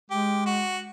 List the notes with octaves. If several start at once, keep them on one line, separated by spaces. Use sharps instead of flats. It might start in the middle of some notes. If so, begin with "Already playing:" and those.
G#3 G4
F#4